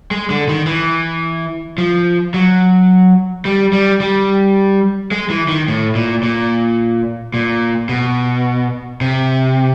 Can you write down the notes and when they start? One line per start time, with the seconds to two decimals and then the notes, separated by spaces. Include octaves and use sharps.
0.11 G#3
0.30 D3
0.48 D#3
0.66 E3
1.78 F3
2.34 F#3
3.45 G3
3.73 G3
4.01 G3
5.11 G#3
5.30 E3
5.48 D#3
5.68 A2
5.95 A#2
6.23 A#2
7.34 A#2
7.89 B2
9.01 C3